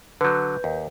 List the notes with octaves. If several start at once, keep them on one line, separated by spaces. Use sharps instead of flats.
D3 F#3 B4 G6
D#2